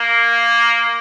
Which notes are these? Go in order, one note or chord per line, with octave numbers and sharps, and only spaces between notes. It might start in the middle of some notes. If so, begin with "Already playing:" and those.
Already playing: A#3